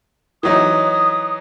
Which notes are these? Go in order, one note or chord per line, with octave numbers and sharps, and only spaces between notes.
E3 F#3 D#4 D#6